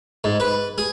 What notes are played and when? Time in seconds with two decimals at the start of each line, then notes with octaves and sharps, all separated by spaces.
0.24 G#2
0.40 B4
0.78 G#4